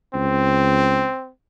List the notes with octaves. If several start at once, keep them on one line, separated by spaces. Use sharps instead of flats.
C#2 C4